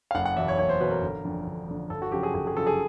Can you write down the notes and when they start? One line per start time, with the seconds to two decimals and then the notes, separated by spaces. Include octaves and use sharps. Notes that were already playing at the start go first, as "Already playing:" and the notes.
0.11 F5
0.15 F#1 F#5
0.25 F#5
0.37 E2 B2 E5
0.48 C#5
0.58 F#1 C#5
0.69 C5
0.81 E2 B2 B4
0.91 A#4
1.02 G1
1.25 F2 D3
1.47 G1
1.68 F2 D3
1.90 G1 A4
2.02 F#4
2.12 F#2 C#3 F3 G4
2.23 G#4
2.34 G1 G#4
2.47 G#4
2.56 F#2 C#3 F3 A4
2.67 G#4